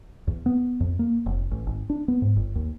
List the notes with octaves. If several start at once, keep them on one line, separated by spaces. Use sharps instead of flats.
E2
B3
F2
A#3
F1
A1
G#1
D4
B3
G#2
G1
D#2